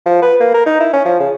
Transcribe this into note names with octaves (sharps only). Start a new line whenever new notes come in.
F3
B4
A#3
A#4
D#4
E4
C#4
F3
C#3